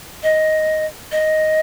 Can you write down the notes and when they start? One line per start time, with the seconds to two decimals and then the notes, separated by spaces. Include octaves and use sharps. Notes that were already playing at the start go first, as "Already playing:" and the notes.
0.23 D#5
1.11 D#5